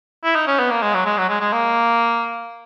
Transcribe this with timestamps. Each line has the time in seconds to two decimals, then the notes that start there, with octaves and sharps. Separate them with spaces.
0.24 E4
0.35 D#4
0.47 C#4
0.59 B3
0.71 A#3
0.82 G#3
0.94 F#3
1.05 G#3
1.18 F#3
1.29 G#3
1.40 G#3
1.53 A#3